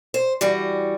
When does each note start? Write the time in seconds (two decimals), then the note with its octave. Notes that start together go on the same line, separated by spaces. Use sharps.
0.14 C5
0.41 E3 G3 F#4